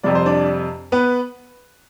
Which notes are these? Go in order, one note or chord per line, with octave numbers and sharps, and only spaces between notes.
F2 C3 G3 D5
C5
D4 D5
B3 B4